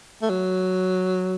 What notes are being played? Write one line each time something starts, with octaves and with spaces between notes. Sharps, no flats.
A3
F#3